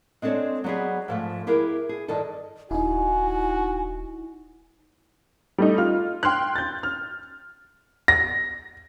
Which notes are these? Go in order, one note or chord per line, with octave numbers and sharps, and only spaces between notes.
G#3 C4 D4 A4 C#5
F#3 G3 B3 G4 G#4
G#2 F3 A3
E4 G4 G#4 A#4 B4
G#4
G2 D#3 G3 D#4 A4
D#1 D#4 E4 F#4 G#5
G3 A3 D#4
F4 F6
G5 C6 F6 F#6
G6 A6
F6
A#6